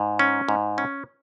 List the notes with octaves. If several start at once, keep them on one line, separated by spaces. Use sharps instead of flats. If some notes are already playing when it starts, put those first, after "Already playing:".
Already playing: G#2
C#4
G#2
C#4